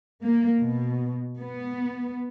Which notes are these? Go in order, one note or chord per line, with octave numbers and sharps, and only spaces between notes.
A#3
B2
B3